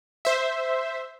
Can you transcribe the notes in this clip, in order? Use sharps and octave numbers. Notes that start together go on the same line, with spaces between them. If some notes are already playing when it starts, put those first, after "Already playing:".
C5 E5